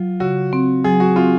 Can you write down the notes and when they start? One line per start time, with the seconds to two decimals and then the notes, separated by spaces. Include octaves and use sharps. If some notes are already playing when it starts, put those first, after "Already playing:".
Already playing: F#3 F4
0.20 C#3 F#4
0.53 C4
0.84 F#3 G#4
1.00 F#4
1.16 C4 F4